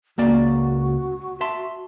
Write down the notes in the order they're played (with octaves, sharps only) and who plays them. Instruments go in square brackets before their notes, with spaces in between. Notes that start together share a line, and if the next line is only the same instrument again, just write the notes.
[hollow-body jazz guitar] C#2 A#3 D5 [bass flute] F#4
[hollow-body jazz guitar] E5 A5 C6